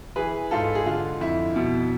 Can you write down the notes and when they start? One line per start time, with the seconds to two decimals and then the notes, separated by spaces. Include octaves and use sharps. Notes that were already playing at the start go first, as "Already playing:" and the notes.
0.16 E3 G#4 B4
0.51 G#2 F4 A4
0.75 G#4
0.86 D3 F4
1.21 F2 E4
1.56 B2